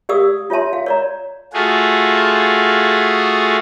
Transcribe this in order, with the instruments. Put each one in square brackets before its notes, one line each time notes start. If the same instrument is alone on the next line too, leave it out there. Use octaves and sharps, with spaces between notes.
[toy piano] G4 D5 F5 D#6 E6
F4 C#5 E5 A5 C6
F5
C#5 D5 A#5
[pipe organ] A3 F4 F#4 G#4